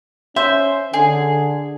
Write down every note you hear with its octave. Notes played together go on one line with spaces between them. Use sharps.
C#4 C5 E5
D3 G#4